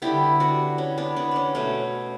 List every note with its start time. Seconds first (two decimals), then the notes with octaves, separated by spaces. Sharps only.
0.02 D3 G3 B3 E4 G4
0.40 D4 F#4
0.78 C#4
0.98 B3 D4
1.16 B3 D4
1.31 C#4 D4
1.55 B2 A3 C#4